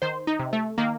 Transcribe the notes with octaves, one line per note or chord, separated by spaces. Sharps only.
D#3 C5
D#4
C3
A3
D#3 A#3